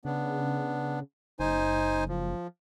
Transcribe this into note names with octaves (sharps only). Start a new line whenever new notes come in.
C#3 B3 D4
F#1 D#4 C5 G#5
F3